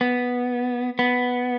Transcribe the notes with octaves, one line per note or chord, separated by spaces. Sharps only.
B3
B3